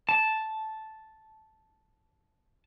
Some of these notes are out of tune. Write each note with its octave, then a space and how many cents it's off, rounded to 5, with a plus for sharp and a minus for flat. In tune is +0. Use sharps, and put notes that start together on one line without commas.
A5 -5